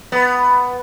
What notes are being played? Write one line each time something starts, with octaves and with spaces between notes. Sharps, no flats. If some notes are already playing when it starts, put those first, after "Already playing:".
B3